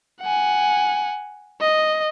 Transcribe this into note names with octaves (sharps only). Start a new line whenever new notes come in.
F#5 G#5
D#5